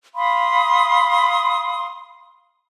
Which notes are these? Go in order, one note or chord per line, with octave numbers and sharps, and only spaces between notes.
F5 B5 C6 D#6